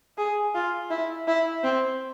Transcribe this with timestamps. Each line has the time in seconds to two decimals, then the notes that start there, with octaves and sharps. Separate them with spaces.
0.18 G#4
0.55 F4
0.90 E4
1.28 E4
1.64 C4